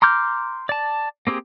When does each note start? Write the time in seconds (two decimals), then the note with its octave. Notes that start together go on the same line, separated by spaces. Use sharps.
0.02 A#5 C6 D6 F6 G6
0.69 D5 A5
1.27 A#3 C4 G4 G#4